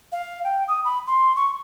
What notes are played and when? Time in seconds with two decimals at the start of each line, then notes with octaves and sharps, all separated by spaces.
0.12 F5
0.44 G5
0.68 D#6
0.85 B5
1.07 C6
1.36 C#6